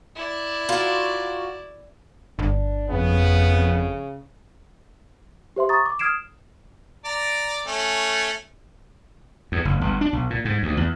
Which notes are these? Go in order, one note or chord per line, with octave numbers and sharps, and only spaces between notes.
E4 D5
F4 F#4 A#4
G1 D4
F2 C#3 B3
G4 C5 E5 C6
A#5 C#6 D#6 A6
D6
D#6 F6 G#6 C7 D7 E7
D5 A#5 D6
A3 C#4
E2
F#1
G1
D4
B1
A#2
G#2
D2
E2